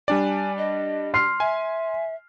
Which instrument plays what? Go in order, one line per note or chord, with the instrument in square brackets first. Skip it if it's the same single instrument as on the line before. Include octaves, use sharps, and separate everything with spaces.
[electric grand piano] G3 D4 D5 [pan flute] G#5
[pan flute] D#5
[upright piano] C6 F6 C7
[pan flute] E5 [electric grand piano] G#5